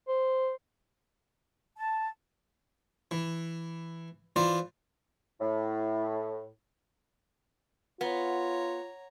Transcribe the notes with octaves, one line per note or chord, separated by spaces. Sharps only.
C5
A5
E3
E3 F4 C5 D5
A2
B3 F4 C#5 A#5